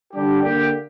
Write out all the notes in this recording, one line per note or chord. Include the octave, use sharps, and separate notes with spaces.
D3 G3 D4 G4
D3 A#3 G4